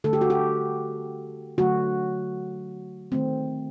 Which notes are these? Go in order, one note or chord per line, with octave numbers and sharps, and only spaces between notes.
D3 A3 A4
G4
F#4
G4
D3 F#3 A3 F#4
D#3 A3 C4